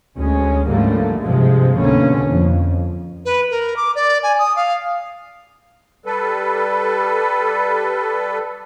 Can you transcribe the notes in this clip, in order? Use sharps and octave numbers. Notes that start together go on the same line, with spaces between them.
D2 G#3 C#4
G#2 D3 F3 G3 A3 A#3
G2 C3 F3 G#3
C2 B2 D3 A#3 C#4
F2
B4
A#4
D6
D5
G#5
D#6
F5
G3 A4 B4